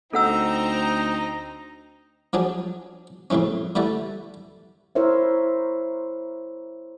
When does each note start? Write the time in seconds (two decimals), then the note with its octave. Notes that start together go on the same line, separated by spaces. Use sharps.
0.13 D2 C4 D#4 A4 F#5 A#5 E6
2.33 F3 F#3 D4 G#4
3.30 F2 A2 C#3 E3 C#4
3.75 D3 E3 G3 A3
4.95 E4 A#4 C5 C#5 E5